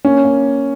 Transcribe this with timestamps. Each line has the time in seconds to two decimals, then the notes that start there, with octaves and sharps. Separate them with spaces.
0.05 A#3 C#4
0.25 A#3